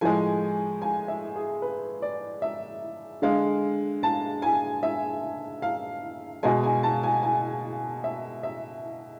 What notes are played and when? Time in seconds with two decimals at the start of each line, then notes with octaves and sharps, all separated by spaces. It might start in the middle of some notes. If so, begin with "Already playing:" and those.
0.01 A2 F3 G#3 G#5
0.82 G#5
1.08 E5
1.36 G#4
1.62 B4
2.02 D5
2.42 E5
3.22 D3 G#3 F5
4.03 A5
4.42 G#5
4.83 E5
5.62 F5
6.43 B2 G#3 G#5
6.64 G#5
6.83 A5
7.03 G#5
7.23 G#5
8.04 E5
8.43 E5